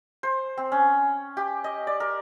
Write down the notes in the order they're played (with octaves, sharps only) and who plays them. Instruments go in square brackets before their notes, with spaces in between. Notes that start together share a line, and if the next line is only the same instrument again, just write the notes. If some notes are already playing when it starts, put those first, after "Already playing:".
[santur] C5
C4
C#4
G4
D#5
D5
A#4